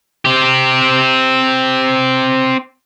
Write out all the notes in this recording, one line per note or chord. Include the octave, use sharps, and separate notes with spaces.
C4 G4